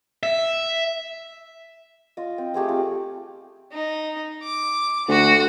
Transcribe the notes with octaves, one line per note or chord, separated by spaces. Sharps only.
E5
F4 D#5
C4
A3 G4 G#4 C5
C4 F4
D#4
D6
D2 F#4